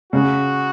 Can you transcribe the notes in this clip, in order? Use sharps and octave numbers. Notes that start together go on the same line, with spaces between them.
C#3 F#4